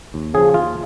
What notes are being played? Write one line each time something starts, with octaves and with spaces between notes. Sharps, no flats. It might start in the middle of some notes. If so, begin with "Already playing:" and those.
D#2
C#3 F3 G#4
D#2 F4